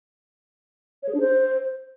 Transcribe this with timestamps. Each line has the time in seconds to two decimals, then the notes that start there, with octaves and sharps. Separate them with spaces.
1.03 C#5
1.09 G#4
1.14 D4
1.20 C5